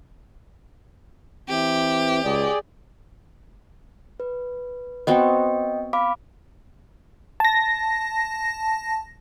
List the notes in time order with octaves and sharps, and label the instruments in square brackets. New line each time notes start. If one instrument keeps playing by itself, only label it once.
[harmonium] E3 [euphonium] C4 [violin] G4
[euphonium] C#2 [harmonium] G#4 D5
[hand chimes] B4
[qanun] B3 C4 F#4 [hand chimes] D#5 G5
[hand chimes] F5 B5 D6
[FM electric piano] A5 A#6